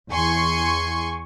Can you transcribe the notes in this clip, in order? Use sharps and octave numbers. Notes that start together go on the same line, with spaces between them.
E2 G#5 C6 C#6